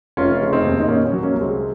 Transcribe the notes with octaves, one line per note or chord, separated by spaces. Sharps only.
F1 C#4 F4
C#3
C4 D#4
D#2
D#4
A#2 A#3 C#4
A#3 C#4
F#3
A#3 C#4
C2
G#3 C4